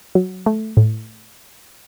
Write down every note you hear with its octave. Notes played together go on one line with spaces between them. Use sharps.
F#3
A3
A2